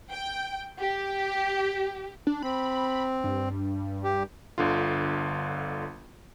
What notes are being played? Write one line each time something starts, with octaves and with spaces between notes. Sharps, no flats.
G5
G4
D4
C4 B5
G2
G4
G1 D3 F4